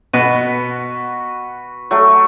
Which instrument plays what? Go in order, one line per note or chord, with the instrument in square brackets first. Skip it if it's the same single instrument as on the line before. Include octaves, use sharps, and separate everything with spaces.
[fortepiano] B2 [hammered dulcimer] F#4 B4 [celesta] D#7
[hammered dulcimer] F#3 A3 [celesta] C#6